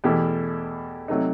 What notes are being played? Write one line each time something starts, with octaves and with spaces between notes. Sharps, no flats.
E2 B2 A3 E4 G4
C3 F#3 A3 D#4